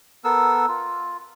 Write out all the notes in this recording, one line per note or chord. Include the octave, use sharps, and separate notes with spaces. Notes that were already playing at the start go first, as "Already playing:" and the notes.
B3 A4 A#4 E6
F4